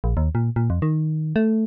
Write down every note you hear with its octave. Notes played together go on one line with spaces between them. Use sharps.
A#1
D#2
A#2
A#2
F2
D#3
A3